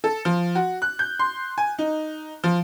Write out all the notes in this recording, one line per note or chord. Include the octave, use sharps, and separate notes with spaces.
A4
F3
F#4
F#6
G6
C6
G#5
D#4
F3